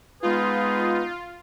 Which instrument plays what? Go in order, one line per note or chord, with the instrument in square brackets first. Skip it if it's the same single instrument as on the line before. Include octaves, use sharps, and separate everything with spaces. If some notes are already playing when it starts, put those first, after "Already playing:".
[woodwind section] G#3 B3 D#4 G#4 B4 [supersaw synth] F4